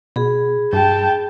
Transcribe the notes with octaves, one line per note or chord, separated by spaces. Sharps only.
B2 G#4 B5
G2 G5 A5